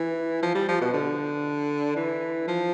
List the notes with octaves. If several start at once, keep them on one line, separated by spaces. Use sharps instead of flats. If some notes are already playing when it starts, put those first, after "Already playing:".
Already playing: E3
F3
G3
F3
B2
D3
E3
F3